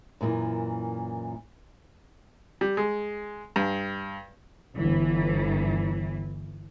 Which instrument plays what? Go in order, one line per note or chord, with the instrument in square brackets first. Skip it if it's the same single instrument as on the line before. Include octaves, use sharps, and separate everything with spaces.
[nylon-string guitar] F#2 A#2 D3 E3
[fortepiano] G3
G#3
G2
[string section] G1 E3